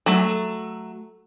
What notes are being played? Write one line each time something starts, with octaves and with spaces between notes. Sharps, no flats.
F#3 A3